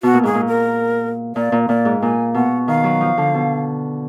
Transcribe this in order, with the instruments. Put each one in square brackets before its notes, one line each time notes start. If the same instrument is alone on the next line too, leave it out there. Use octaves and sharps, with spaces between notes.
[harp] B2 [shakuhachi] F#4
[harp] A#2
[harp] G#2 [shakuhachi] G#4
[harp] A#2
[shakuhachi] A#4
[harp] A#2 [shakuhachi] D5
[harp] A#2
[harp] A#2 [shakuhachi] D5
[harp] G#2
[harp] A#2 [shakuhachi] G#5
[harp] B2 [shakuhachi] F#5
[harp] D#3 [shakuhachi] F5
[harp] F#3
F3
D3
B2